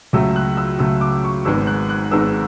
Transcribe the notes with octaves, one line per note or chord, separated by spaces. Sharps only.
C#2 C#3 F#3 A3 E6
F#6
E6
C#2 C#3 F#3 A3 E6
D6
C#6
G#1 G#2 G#3 B3 E6
F#6
F#6
G#1 G#2 G#3 B3 E6